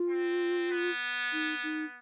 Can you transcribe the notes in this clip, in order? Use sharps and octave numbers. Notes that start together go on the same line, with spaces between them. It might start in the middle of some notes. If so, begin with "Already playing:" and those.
Already playing: F4
C4
B3
D#4
D#4